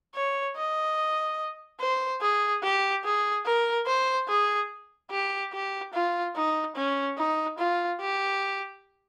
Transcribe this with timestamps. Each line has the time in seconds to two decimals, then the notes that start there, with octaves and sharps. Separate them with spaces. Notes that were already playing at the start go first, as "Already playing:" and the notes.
0.15 C#5
0.56 D#5
1.80 C5
2.21 G#4
2.63 G4
3.05 G#4
3.45 A#4
3.86 C5
4.28 G#4
5.11 G4
5.53 G4
5.93 F4
6.35 D#4
6.76 C#4
7.18 D#4
7.58 F4
8.01 G4